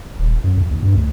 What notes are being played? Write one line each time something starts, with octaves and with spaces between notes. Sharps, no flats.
D#1
F#2
F2
D#2
G2
D2